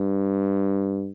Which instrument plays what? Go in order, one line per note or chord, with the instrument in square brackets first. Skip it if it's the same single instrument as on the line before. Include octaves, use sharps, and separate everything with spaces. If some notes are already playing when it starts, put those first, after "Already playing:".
Already playing: [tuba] G2